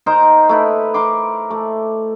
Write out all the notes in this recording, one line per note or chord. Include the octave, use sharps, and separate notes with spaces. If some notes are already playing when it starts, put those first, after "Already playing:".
D#4 A#4 C5 A#5
A3 E4 B4
A#4 C6 D6
A3